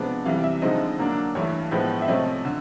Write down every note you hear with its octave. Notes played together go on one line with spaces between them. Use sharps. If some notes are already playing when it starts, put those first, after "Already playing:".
Already playing: C3 F3 G#3 B3 D4
C3 E3 G3 F5
E5
D3 F3 G#3 C4 D#4 D#5
D3 F#3 A#3 D4
G2 E3 A3 C#5
A2 F3 G#3 B3
E5
C3 F3 A3 C#4 D#5
D3